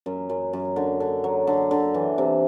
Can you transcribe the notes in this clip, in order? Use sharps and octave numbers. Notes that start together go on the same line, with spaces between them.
F#2
F#2
F#2
D3
D3
F#3
D3
D3
E3
C3